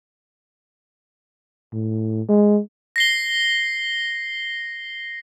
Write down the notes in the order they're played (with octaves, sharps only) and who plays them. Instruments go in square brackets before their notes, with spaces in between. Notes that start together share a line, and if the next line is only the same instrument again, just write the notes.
[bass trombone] A2
G#3
[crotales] A#6 C7 G7